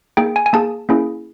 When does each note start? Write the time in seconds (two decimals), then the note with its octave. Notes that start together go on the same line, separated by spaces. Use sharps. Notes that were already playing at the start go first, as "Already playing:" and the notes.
0.17 A#3 D#4 G#4 G5
0.36 G#5
0.46 G#5
0.53 A#3 D#4 G#4 A5
0.89 A#3 C#4 E4 G#4